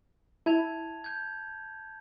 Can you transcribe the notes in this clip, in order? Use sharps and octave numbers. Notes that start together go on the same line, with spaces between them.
E4 A5 G#6 F7
G6 G#6